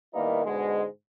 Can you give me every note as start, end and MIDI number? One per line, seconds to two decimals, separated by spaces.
0.14 0.45 51
0.14 0.45 55
0.14 0.45 58
0.14 0.45 59
0.14 0.45 63
0.14 0.45 64
0.45 0.84 44
0.45 0.84 47
0.45 0.84 50
0.45 0.84 56